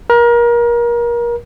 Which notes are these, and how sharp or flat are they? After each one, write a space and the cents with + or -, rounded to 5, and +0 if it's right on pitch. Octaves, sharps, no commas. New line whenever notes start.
A#4 +30